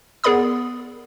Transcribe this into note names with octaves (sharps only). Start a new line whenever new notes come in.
B3 G#4 A#4 D5 B5 D#6